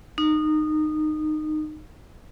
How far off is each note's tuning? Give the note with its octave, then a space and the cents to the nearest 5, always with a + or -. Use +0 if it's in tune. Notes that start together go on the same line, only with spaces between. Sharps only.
D#4 -20